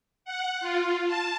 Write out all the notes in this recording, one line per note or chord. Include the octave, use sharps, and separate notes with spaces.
F#5
F4
A5